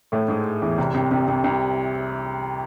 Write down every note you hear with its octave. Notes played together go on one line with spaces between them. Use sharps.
A2 A3
G#2 G#3
E2 E3
C2 C3
C2 C3
C2 C3
C2 C3
C2 C3